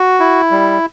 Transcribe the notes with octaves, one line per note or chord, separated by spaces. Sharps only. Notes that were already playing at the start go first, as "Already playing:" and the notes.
Already playing: F#4
E4
G3